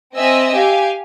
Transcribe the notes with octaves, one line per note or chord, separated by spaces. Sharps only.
C4 D#5 E5 G#5 E6
G4 F5 G#5